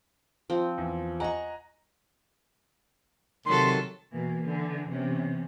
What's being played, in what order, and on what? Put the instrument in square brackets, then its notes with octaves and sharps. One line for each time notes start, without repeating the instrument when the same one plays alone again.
[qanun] F3 C4
[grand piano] E2
[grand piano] D#5 G#5 A#5 [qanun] F#5 C#6
[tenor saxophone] C3 [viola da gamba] D#3 F#3 A4 [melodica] C6
[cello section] B2 E3 A#3
D3 E3
C3 E3 B3 C#4